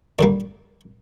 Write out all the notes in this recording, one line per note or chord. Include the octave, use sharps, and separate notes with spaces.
D#2 D3 G3 A#3 D5